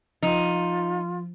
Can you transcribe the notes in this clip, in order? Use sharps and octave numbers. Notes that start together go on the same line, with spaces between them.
F3 D#4 F4